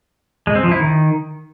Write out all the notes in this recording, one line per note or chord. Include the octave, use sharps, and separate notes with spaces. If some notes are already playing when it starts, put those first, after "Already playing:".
G#3
C4
F3
E4
D#3